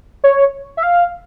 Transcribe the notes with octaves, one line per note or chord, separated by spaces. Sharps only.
C#5
E5
F5